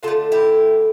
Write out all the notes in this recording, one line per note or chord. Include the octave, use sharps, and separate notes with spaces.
D3 F4 A4
A3
E4 G4